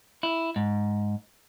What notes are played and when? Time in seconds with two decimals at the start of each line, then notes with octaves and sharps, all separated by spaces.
0.23 E4
0.56 G#2